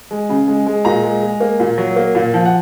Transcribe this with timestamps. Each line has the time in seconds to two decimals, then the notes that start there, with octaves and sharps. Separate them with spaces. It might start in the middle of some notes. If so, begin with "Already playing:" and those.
0.11 G#3
0.29 C#3
0.48 G#3
0.66 G#3
0.85 A#2 A#5
1.03 G#3
1.22 G#3
1.40 A#3
1.60 A#2
1.78 F#3
1.96 A#3
2.15 A#2
2.34 F3
2.46 F#5